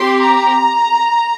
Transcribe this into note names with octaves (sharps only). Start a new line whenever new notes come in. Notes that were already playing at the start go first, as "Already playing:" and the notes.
Already playing: C4 G4 C6
A#5